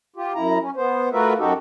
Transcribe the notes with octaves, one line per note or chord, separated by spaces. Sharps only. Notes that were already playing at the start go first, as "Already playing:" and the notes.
F4 G4
F#2 E4 A#5
C#4
B3 C5
A3 F4 F#4 A#4 B4 E5
F#2 D#4 F#4 G4 A4